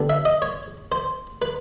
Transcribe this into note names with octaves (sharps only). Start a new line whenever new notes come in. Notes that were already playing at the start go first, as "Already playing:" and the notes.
Already playing: D3 G3 B3 D4
E5
D#5
C#5
C5
B4